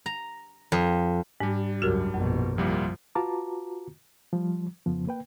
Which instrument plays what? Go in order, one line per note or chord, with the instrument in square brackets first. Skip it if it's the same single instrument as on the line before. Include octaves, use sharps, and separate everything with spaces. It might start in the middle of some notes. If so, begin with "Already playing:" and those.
[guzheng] A#5
F2
[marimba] G#2 [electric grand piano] G3 D4
[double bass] C#2 F#2 [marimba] F#4 G4 A#4
[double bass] A#1 B2 [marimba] F#2
[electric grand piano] C2 G3 A#3 [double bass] F3
[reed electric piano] F4 F#4 B4 A5 A#5 D6
F3 G3
F2 C#3 F3 B3
A#3 B4 G5